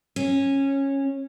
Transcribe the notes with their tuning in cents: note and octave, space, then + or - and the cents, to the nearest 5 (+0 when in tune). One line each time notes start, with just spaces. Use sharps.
C#4 -15